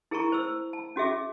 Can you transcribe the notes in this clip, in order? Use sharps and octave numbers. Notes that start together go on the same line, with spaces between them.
E4 G#4 A#4 A5 A#5 C#6
C5 E6
A5
C#4 F#4 G#4 E5 D6